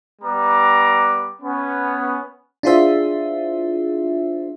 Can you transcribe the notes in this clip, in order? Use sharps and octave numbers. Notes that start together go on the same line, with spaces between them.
G3 B3 A#5 D6
B3 C#4
D4 E4 F4 G#4 C5 E5